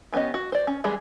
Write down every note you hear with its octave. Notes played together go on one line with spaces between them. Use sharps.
E3 B3 C#4 G4 D#5
F#4
C5 D5
C#4
E3 G3 G#3 G#4 B5